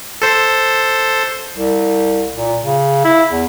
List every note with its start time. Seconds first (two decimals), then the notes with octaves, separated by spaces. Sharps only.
0.22 A4 C5
1.57 C2
2.36 A#2
2.63 C#3
3.04 E4
3.32 E2